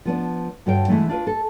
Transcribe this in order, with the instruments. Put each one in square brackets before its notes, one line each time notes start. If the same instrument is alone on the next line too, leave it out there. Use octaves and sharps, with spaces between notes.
[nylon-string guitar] F3 B3 D4
G2 D3 F#4 C#5 F5 G5
D3 E3 G#3 A3 C4
D4 F4 B4
A4